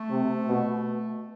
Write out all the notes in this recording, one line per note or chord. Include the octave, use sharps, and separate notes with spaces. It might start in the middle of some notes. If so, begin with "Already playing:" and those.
Already playing: A3
C3
B2